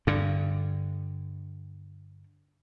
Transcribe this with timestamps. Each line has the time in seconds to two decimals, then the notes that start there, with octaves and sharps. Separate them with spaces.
0.07 G2 D3